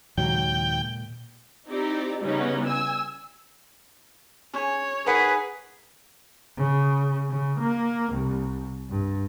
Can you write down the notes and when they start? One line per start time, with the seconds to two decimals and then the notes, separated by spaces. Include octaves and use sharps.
0.18 D#2 A#2 C#3 F#3 G#3 G5
1.68 C4 D#4 E4 G4 D5
2.22 C#3 E3 G3 B3 C#4 D#4
2.66 G#5 E6
4.53 C#4 G#4 C#5
5.06 D#4 G#4 A#4 B4 F#5
6.57 C#3
7.30 C#3
7.59 A#3
8.13 C2
8.89 G2